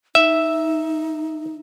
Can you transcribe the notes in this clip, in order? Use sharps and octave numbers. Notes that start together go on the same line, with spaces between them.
D#4 E5